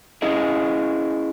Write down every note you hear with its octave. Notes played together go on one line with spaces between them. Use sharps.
C#4 E4 G#4 D#5